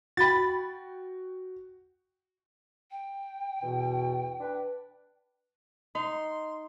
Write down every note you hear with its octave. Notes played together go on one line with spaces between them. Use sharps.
F#4 G5 B5 A6
G5
E2 B2
D4 B4
D#4 C6